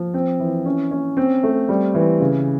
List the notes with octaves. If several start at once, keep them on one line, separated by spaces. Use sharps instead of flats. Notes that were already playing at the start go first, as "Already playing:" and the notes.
Already playing: F3
C4
E3
C#4
C#4
C4
A3
G3
E3
C#3